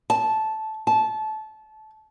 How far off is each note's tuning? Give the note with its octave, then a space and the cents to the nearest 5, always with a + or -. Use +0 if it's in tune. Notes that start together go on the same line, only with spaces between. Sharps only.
A5 -10
A5 -20